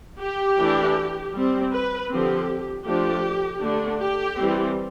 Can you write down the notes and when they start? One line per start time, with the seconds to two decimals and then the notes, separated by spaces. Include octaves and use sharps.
0.21 G4
0.58 E3 A3 D4
1.34 G3 C4
1.73 B4
2.10 D3 F3 C4 G4
2.85 F3 A3 D4 G4
3.62 D3 A3 D4
3.99 G4
4.37 E3 G3 C4